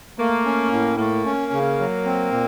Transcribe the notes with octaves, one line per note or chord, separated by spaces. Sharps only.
A3 A#3
C#4
A2
A3 A#3
C#4
C#3
F#3
C4
A#2